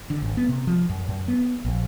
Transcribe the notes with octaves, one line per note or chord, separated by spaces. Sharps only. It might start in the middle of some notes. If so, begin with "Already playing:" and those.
D3
G#1
B3
C3
F3
F#2
F#2
B3
A#1